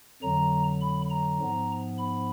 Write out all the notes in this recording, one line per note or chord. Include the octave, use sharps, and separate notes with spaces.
F2 D3 F#3 A#5
B5
A#5
G#2 F3 B3
B5